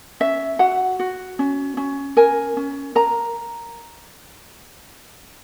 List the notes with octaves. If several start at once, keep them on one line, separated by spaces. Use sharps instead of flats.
C#4 E5
F#4 F#5
F#4
C#4
C#4
A#4 G#5
C#4
A#4 A#5